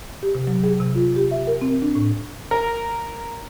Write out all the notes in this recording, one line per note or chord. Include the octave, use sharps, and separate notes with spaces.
G4
C3
F#3
G#4
C3
F4
G4
E5
A#4
C4
D4
A2
A#4